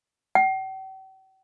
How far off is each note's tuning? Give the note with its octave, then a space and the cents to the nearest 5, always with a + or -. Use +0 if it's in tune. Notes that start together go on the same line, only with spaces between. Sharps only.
G5 -45